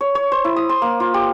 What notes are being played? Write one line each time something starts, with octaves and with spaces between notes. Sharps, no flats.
C#5
C#5
C5
E4
D#6
C6
A#3
F4
G4